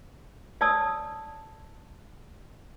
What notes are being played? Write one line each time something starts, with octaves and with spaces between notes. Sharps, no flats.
C#5 D5 A5 D#6 E6